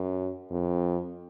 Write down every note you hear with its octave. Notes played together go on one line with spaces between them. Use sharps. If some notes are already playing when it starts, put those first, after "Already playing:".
Already playing: F#2
F2